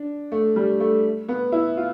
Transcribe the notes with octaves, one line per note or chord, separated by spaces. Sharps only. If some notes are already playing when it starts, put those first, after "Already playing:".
Already playing: D4
A3
G3
A3
B3
E4
F4